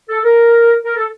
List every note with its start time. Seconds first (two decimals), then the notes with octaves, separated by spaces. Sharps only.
0.09 A4
0.24 A#4
0.84 A#4
0.97 A4